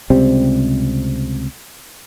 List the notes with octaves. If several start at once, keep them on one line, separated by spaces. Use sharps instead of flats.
C#2 C3 G3 C4